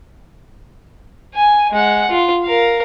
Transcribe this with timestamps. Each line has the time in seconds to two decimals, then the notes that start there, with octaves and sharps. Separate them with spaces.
1.34 G#5
1.71 G#3 F#5
2.11 F4
2.44 A#4 F5